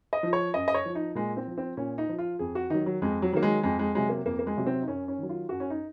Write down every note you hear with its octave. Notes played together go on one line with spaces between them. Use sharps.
D#5
F3
C#5
F#2 D#5
D#5
C#5
F3
D#4
A#2 G#3
C4
F3
C4
A#2 C#4
D#4
F3
F4
F2 G#4
F#4
D#3 F#3 D#4
F#3
F2 G#3
F#3
D#3 F#3 A#3
G#3
F2 G#3
G#3
C3 F#3 G#3
A#3
F2 A#3
A#3
G#3
C3 F#3
C4
D#4
F#2 C#4
C#4
D#3 F#3
F4
F#2 F#4
C#4
D#4